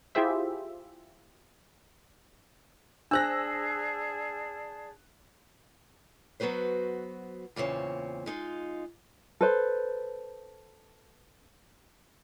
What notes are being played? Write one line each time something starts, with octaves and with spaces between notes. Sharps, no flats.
E4 F4 G4 G#4 C5 E5
D4 G#4 C5 D5 A5 E6 F#6 A#6
F#3 B3 F#4 B4 C5
E2 A#2 C#3 C4 C#5
G#3 D#4 F4
A4 B4 C5